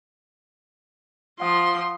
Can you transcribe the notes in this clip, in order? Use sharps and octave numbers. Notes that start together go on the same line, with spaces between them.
F3 F5 F#5 C6 D#6